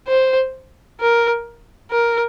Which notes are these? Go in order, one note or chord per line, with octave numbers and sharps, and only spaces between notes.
C5
A#4
A#4